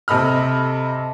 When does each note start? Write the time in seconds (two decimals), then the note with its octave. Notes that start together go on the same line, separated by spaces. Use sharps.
0.08 C3 A4 D#5 B5 F6